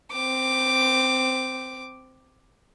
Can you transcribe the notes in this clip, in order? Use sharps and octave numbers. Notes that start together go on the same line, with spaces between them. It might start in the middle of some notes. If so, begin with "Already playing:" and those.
C4 D6